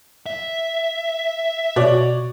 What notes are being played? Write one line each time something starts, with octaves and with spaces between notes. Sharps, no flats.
E5
B2 F#4 C#5 D5